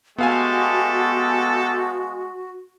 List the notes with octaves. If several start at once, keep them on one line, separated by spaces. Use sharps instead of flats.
G#3 A3 B3 F#4 G4 A4 F5 G#5